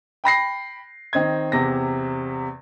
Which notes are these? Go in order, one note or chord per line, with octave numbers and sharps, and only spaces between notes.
G5 B5 A#6 C7
D#3 C4 D#5 G#6
E2 C3 A#6